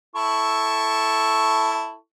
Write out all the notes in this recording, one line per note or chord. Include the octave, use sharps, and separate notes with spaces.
E4 A4 C#6